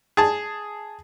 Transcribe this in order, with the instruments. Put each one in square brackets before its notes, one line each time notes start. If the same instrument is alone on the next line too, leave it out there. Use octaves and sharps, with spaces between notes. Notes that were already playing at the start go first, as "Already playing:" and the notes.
[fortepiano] G#4 A5